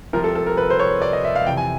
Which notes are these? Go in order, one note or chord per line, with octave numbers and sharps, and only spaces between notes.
C2 C3 F3 A#4
A4
A4
A#4
B4
C5
C#5
D5
D#5
E5
F5
F2 C3 E3 G5
G#5